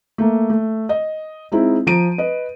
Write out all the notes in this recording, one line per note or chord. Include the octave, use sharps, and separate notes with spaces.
A3 A#3
A3
D#5
G#3 C4 D#4 E4
F3 A#5 D7 D#7
B4 D#5